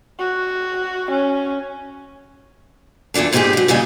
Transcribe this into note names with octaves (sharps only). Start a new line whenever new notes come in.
F#4
C#4
E2 G2 A#2 D4 A4
G#2 E3 D#4 F4 G4 G#4
F3 F#3
A#2 C#3 G3 D#5 G#5